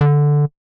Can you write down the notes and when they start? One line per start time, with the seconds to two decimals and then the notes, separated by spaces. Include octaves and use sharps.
0.01 D3